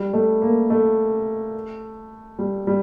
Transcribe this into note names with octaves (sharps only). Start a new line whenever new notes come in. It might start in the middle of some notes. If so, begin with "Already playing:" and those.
Already playing: G3
A3
A#3
A3
G3
G3